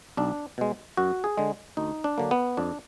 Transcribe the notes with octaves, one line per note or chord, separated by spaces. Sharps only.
B1 D4
B2 G#3
F#2 F#4
G#4
D3 G#3
D2 D#4
D4
D3 F#3 A#3
B3
F2 D4